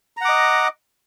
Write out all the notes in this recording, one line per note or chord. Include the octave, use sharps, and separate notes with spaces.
D#5 F#5 A#5 D6